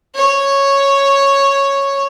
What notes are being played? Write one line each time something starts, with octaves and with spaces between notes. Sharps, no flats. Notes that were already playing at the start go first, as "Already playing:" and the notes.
C#5